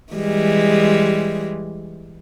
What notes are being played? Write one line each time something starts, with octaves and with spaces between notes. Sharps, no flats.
E3 G3 G#3